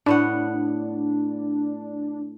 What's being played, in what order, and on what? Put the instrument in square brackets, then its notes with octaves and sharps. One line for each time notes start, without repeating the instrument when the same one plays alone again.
[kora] A2 B3 F#5 [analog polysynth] D4